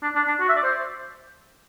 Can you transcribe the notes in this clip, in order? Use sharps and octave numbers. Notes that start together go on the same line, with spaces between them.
D4
D4
D4
F#4
E5
D5
C5